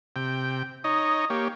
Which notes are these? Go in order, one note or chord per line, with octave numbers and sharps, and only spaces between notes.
C3 G5
D#4 C#5 D#5
A#3 G4 C#5